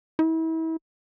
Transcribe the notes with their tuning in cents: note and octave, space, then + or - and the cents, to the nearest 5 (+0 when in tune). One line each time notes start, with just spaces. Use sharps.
E4 -35